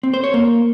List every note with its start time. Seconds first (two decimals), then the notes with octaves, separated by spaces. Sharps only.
0.03 C4
0.14 C5
0.24 C#5
0.34 A#3